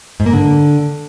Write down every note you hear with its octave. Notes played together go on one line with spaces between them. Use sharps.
G#2
A#3
D3